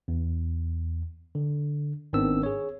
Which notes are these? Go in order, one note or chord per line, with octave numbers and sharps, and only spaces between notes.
E2
D3
G#1 D#3 B3 C4 D4 E6
G#4 C#5